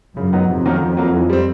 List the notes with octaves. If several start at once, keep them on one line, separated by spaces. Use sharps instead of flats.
F#2 C#3
F#3 B3 D#4
F2 C3
D#3 F#3 A#3 C#4
D#3
F#3 A#3
E3
G3 C4